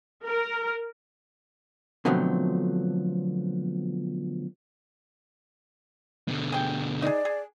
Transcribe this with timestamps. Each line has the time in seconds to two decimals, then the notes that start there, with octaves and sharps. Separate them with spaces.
0.25 A#4
2.05 B2 D3 F3 F#3 A3 C4
6.28 B2 D3
6.52 G#4 G5
7.02 D#4 G#4 D5
7.25 G#4